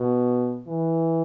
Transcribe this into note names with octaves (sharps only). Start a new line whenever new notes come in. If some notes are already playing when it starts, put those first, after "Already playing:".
Already playing: B2
E3